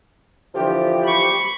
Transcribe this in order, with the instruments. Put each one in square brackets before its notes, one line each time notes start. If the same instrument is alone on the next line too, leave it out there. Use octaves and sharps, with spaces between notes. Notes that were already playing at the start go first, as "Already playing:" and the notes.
[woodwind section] D3 E3 F3 [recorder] G4
[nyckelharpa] B5 C#6